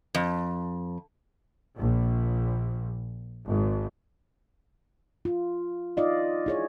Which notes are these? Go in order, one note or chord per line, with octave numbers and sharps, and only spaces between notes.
F2
A#1
G#1
F4
D#4 F4 D5 D#5 F5
E4 G#4 C#5